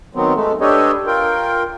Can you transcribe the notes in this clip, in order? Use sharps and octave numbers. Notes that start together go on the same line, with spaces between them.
D#3 F#3 B3 C4
G#3 A3
D4 G4 A4 B4 C#5 D#5
F4 A#4 G5